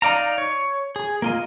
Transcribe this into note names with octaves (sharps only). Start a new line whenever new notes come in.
D#4 D5 F5 A#5
C#5
G#4
A#3 F4 D#5